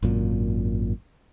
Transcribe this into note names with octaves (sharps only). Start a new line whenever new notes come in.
G#1 F#2 A#2